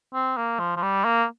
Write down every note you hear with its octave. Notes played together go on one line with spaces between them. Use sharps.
C4
A#3
F3
F3
G3
A#3